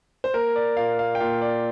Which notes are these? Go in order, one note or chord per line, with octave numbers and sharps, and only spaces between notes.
C5
A#3 A#4
D5
A#2 F5
F5
G5
A#2 F5
D5